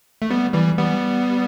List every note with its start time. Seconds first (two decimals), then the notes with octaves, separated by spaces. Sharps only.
0.22 A3
0.30 G3 B3
0.54 E3 G3
0.78 G3 B3